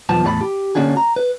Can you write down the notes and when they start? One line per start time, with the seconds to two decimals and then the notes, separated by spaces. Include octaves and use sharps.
0.09 B1 E2 F3 B3 A5
0.23 E2 A2 G#4 C#5 A5 B5
0.41 G4
0.75 D3 A#3 C#4 D4 F#4 G#4
0.97 A#5
1.16 B4